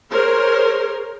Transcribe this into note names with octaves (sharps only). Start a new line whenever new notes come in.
G#4 A#4 C5 C#5